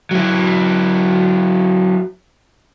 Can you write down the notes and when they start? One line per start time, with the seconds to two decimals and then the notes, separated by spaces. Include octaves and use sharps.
0.11 F#3 E4